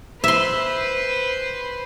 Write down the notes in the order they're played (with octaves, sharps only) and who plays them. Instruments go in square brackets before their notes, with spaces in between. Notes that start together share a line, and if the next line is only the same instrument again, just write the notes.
[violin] B4 C5 [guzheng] E5 C6